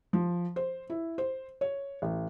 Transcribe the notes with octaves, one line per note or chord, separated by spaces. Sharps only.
F3
C5
E4
C5
C#5
A1